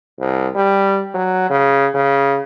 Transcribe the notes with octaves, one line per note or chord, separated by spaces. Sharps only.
C2
G3
F#3
C#3
C#3